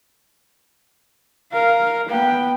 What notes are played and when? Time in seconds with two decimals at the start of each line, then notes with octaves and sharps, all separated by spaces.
1.52 A#4 F5
2.09 B3 G5